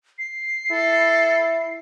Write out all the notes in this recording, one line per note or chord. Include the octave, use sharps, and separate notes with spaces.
C7
E4 A4